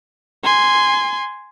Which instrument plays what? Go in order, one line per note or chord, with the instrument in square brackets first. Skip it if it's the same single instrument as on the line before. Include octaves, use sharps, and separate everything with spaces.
[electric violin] G#5 C6